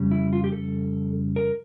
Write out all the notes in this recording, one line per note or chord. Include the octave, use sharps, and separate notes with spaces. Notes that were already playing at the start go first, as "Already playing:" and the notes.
Already playing: F2 C#3 G3
E4
F4
G4
A4
A#4